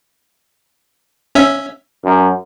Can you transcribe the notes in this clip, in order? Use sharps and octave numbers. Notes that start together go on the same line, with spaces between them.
C#4 E5
F#2